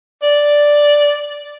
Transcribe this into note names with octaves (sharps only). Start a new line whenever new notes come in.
D5